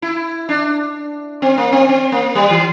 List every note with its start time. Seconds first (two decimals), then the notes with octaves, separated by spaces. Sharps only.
0.02 E4
0.49 D4
1.42 C4
1.58 A#3
1.72 C4
1.89 C4
2.12 A#3
2.35 G3
2.50 E3